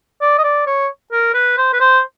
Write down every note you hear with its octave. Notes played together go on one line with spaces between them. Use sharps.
D5
D#5
D5
C#5
A#4
B4
C5
B4
C5